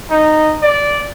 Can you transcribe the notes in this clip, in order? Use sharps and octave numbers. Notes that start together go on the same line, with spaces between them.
D#4
D5